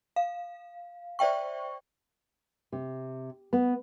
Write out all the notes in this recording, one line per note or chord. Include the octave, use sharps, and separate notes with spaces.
F5
C5 D5 E5 G5 C#6
C3
B3